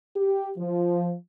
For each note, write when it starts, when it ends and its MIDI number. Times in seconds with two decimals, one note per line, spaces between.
0.16 0.51 67
0.58 1.14 53